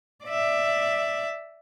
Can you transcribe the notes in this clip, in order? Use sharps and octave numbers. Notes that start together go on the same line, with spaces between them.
D5 E5